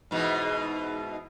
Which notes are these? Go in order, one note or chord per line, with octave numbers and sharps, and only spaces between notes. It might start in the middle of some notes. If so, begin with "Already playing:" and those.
G#2 B2 E3